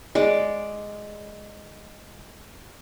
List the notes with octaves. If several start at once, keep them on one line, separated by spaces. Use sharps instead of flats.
G#3 D5